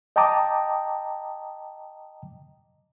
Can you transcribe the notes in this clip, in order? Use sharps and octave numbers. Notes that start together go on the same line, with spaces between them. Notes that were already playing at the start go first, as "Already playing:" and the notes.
D#5 G5 A5 A#5 D6 D#6